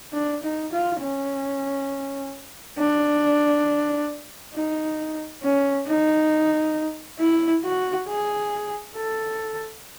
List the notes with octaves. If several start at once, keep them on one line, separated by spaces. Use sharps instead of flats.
D4
D#4
F4
C#4
D4
D#4
C#4
D#4
E4
F#4
G#4
A4